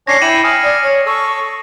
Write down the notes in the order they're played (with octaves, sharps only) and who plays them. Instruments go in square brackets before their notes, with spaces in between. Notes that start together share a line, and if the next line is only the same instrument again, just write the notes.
[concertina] C#4 D4 C#5 [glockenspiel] A#6 C7 C#7
[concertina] E4 G5 [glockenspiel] D#7 E7 F#7
[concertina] G#5 F6 [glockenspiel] D#6
[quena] D5
C#5
[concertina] A4 [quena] C#6